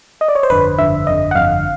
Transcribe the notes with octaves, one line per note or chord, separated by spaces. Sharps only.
D#5
D5
C#5
C5
G1 F2 D3 B4
G1 F2 D3 E5
G1 F2 D3 D#5
F#5
G1 F2 D3 F5